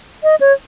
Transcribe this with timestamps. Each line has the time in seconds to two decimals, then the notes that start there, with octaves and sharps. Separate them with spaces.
0.23 D#5
0.41 C#5